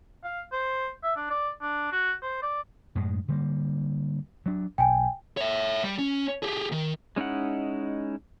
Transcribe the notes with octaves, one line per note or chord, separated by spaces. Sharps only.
F5
C5
E5
D4
D5
D4
F#4
C5
D5
F#2 A2 G#3
D3 G3 A#3
F#3 D4
B1 G5 G#5
C#5 E5
G3
C#4
G4 G#4
D#3
G#3 C#4 D#4 E4 F#5